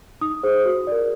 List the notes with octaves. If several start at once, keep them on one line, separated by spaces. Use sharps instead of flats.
D#4 D#6
G#4 C5
F#4
A#4 D5